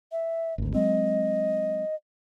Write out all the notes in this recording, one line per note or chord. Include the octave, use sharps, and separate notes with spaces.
E5
G#1 D2
F#3 G#3 C4 D#5